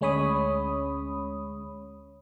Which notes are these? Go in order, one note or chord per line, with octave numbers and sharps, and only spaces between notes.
D2 G#3 C#4 C#5 B5 D#6